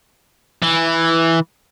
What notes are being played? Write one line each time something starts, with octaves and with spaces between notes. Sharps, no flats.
E3